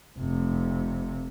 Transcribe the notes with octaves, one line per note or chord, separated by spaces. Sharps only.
F1 C3